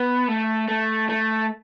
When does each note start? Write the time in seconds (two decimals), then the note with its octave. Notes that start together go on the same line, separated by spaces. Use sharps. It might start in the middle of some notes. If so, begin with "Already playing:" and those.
Already playing: B3
0.28 A3
0.68 A3
1.09 A3